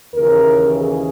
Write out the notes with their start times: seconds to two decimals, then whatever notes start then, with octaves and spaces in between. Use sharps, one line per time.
0.15 D#2 C#3 E3 A#4
0.78 G#4